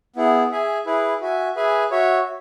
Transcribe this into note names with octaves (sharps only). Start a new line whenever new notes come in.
B3 E4 G#4
G#4 E5 G#5
E4 G#4 B4
F#4 E5 G#5
G#4 B4 E5 G#5
F#4 C#5 E5